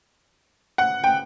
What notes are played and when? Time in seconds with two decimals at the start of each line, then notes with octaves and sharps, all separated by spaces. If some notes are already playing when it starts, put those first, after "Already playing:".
0.78 F#5
1.04 G5